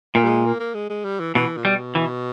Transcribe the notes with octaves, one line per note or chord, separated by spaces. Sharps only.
A#2 A#3
G3
G#3
A#3
A#3
G#3
G#3
G3
E3
B2 E3
A#2
B2 G3
E3